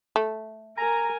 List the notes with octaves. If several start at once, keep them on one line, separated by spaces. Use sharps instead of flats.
A3
A#4 G#5 A#5